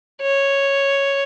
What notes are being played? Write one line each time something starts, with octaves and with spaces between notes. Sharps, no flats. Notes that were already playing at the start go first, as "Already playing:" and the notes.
C#5